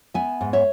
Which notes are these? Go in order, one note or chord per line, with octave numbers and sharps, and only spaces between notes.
B3 E5 G#5
G#2
C#5 E5